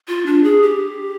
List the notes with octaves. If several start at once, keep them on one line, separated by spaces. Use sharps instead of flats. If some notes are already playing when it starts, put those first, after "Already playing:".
F4
D4
G#4
G4